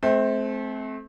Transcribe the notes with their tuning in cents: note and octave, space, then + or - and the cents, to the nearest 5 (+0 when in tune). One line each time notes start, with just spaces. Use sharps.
A3 -35 C4 +0